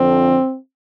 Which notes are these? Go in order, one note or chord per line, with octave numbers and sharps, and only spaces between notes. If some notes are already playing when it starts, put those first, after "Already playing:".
Already playing: F2 D3 F3 C4